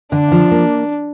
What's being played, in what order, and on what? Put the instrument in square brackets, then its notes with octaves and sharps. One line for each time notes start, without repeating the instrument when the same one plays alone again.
[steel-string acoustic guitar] D3 [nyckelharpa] D4
[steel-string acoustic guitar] F3
A#3